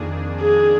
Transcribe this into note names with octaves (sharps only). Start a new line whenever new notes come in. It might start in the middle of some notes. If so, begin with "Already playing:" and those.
Already playing: F2 D#3 A#3 D4 G#4
G#4